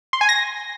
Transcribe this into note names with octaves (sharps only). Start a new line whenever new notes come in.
C6
G#5
A#6